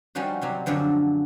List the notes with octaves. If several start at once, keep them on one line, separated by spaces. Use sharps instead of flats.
F3 G3 C#4 D#4 F#4
C3 F#3 G3
F#2 D3 F3 F#3